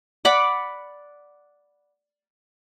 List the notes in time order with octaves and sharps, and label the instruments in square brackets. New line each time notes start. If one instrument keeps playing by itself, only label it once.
[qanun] D5 F#5 B5 D6